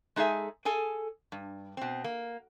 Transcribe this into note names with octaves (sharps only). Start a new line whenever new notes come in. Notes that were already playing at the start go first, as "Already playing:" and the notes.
G#3 D#4 G#4 A4 E5 G#5
G#4 A4 G#5
G2
B2 C4
A#3